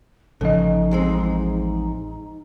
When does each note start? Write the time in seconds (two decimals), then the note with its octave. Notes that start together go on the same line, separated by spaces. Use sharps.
0.41 A1 C#3 F3 D#4 A4 D#5
0.91 E2 G#3 C4